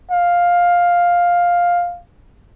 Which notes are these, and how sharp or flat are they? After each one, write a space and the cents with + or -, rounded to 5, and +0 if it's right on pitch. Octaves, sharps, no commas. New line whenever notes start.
F5 +10